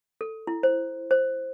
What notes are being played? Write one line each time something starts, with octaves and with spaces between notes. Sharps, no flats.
A4
E4
C5
C5